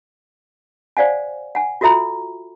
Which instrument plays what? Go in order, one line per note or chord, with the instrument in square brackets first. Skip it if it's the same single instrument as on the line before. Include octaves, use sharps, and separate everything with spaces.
[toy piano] C5 D5 F5 F#5 G#5
F#5 G#5
F4 F#4 A4 E5 A#5 B5